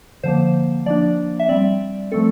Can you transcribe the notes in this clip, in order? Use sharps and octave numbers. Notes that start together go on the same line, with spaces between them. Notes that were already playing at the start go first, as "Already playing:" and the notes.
D3 F3 A#3 C5
F3 A#3 D4 D5
E5
G3 C4 D5
F3 A3 C4 A4